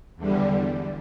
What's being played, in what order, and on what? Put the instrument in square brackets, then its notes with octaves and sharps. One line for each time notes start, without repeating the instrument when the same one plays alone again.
[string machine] E2 D3 G3